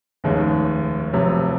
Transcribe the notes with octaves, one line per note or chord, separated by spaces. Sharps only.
F1 D#2 D#3 G#3 C#4
F1 F2 C3 F#3